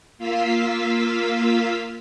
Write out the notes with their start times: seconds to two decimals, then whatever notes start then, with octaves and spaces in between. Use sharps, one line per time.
0.18 A#3 F4 F5 E6 B6